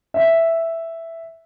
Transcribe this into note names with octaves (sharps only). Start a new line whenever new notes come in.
E5